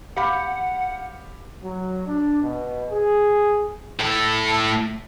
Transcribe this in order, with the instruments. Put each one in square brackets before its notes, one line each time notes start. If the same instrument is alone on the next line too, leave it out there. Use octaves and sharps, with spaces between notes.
[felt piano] G4 F5 B5 [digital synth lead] F#5
[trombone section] F#3
D4
B2
G#4
[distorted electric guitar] A2 A4